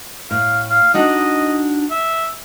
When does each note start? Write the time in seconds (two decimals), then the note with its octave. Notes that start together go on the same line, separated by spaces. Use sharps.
0.31 A2 F5
0.70 F5
0.94 D4 D#4 F#4 D#5
1.90 E5